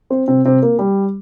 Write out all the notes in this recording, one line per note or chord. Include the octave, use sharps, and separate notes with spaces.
C4 C5
C3 C4
C3 C4
A#3
G3